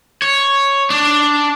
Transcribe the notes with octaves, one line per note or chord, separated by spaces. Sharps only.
C#5
D4